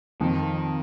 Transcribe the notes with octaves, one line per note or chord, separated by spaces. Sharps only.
F2 D#3